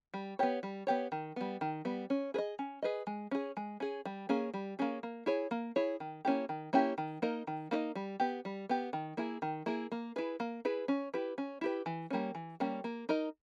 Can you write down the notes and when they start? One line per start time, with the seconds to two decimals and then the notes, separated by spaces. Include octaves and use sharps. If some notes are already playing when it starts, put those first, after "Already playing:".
0.14 G3
0.39 B3 G4 C#5
0.63 G3
0.87 B3 G4 C#5
1.12 D#3
1.36 G3 B3
1.61 D#3
1.85 G3 B3
2.10 C#4
2.34 G#4 B4
2.38 D#5
2.59 C#4
2.82 G#4 B4 D#5
3.07 G#3
3.31 C#4 G#4
3.57 G#3
3.80 C#4 G#4
4.05 G3
4.29 A#3 C#4 G#4
4.54 G3
4.79 A#3 C#4 G#4
5.03 A#3
5.26 E4 G#4 C#5
5.51 A#3
5.76 E4 G#4 C#5
6.00 D#3
6.25 A#3 C#4 E4 G4
6.49 D#3
6.73 A#3 C#4 E4 G4
6.98 D#3
7.22 A#3 D#4 A#4 D#5
7.47 D#3
7.71 A#3 D#4 A#4 D#5
7.95 G3
8.20 B3 G4
8.45 G3
8.69 B3 G4
8.93 D#3
9.17 A#3 E4 G#4
9.42 D#3
9.66 A#3 E4 G#4
9.92 A#3
10.16 E4 G#4 B4
10.40 A#3
10.65 E4 G#4 B4
10.88 C#4
11.14 E4 G4 B4
11.38 C#4
11.61 E4 G4 B4
11.86 E3
12.10 G3 A#3 C#4
12.35 E3
12.60 G3 A#3 C#4
12.84 A#3
13.09 D#4 A#4 D#5